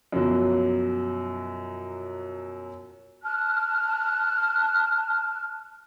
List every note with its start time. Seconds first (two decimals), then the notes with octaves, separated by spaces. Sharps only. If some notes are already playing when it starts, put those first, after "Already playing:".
0.12 F#2 B2 F3 F#3
3.23 A5 F6 F#6